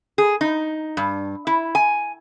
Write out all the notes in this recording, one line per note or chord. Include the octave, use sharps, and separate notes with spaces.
G#4
D#4
G2
E4
G#5